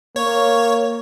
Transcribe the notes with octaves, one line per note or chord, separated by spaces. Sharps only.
A#3 C#5